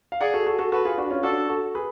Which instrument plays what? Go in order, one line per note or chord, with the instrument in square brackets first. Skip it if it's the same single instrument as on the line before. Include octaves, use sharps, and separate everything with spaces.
[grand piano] F5
[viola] G#4 [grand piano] D5 F#5
[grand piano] F#4 A4
F#4 A4
F#4 A4
[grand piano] F#4 A4 [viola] B4
[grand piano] F4 G#4
D4 F#4
C#4 F4
[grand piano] D4 F#4 [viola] A4
[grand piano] F#4 A4
G#4 B4